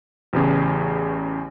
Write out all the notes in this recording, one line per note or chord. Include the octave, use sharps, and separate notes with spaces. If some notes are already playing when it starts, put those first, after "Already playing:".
A1 E2 C#3